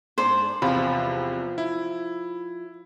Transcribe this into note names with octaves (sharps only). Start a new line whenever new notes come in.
G#2 D4 C5
E2 C3 F3 B5
E4